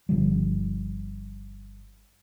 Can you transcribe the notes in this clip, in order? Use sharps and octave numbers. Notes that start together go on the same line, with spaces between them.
G1 D3 F3 G3